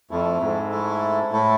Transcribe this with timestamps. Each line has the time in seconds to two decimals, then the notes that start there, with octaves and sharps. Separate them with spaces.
0.10 F2 A3 E4 A4
0.40 G#2
0.70 A3 E4 A4
1.32 A2 A3 E4 A4